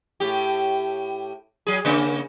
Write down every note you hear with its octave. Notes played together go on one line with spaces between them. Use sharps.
A2 G4
F#3 G#4
C#3 A#3 C#4